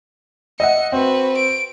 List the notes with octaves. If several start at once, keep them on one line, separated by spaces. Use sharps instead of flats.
D#5 E5 F#5 C#7
C4 F#4 B4
D7